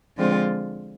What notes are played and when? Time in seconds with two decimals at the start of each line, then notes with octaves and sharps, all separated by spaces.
0.17 D3 F3 G#3 C4 F4